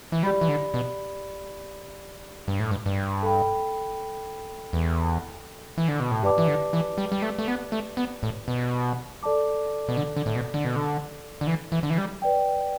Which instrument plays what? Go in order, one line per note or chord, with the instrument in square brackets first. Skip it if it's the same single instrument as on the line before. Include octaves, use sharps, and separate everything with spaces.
[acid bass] E3
[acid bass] G3 [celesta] G4 D5 B5
[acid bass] E3
D3
B2
G2
A2
G2
G2
[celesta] A4 G5 B5
[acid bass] E2
E3
D3
B2
A2
[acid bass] G2 [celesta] G4 B4 D5 A5 D6
[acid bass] E3
D3
E3
G3
G3
A3
A3
B3
A3
B3
A2
B2
[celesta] A4 D5 A5 D6
[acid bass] B2
D3
D3
A2
B2
D3
B2
D3
D3
E3
E3
D3
E3
G3
[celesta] B4 D5 G5